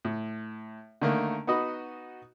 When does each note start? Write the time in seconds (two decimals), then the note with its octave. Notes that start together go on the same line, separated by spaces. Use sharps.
0.05 A2
1.01 D3 D#3 A3 A#3 A#4
1.47 B3 D#4 F#4 D#5 B5